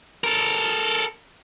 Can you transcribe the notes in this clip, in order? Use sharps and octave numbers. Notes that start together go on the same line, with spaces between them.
A4 A#4